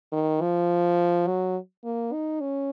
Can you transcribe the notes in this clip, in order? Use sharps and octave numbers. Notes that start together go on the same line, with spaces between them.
D#3
F3
F#3
A#3
D#4
C#4